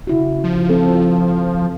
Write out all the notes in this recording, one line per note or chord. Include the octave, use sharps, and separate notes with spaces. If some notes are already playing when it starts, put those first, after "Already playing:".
C#3 E4 F#4
F3
C4 A4